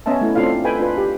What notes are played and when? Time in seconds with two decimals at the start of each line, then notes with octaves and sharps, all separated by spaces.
0.06 B3 C#4 D#5 E5 A5
0.21 A3 E4
0.35 A3 C4 D4 F4 A4 F5
0.64 A4 B4 D#5 G5 G#5 B5
0.79 D4 F4 B4
0.98 G4